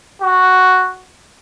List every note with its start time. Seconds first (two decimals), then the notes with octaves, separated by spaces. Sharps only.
0.22 F#4